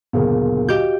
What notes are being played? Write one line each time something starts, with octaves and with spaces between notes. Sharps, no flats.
F#1 D2 A#2 B3 G#4 A#4
F#4 G4 D#5 F5 G6